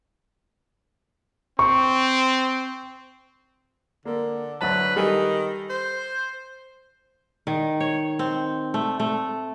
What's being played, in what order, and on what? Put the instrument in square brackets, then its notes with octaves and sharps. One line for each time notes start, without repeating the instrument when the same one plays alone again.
[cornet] C4 [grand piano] C#6
[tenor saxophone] D3 [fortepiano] A#3
[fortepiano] D2 F#3 A5 [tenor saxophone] B4
[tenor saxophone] D#3 [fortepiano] G3 A4 G#5
[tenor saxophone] C5
[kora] D#3
C#5
C4
A3
A3